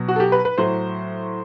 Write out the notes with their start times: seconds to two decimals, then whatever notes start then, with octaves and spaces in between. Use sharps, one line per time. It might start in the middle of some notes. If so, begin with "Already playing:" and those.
Already playing: B2 F#3
0.08 F#4
0.16 A4
0.20 G4
0.32 B4
0.45 B4
0.58 A2 F#3 C5